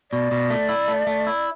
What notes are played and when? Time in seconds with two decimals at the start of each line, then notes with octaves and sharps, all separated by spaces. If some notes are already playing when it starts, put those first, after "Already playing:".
0.11 B2 D5
0.31 B2
0.50 A3
0.69 E4
0.88 A3
1.07 A3
1.27 E4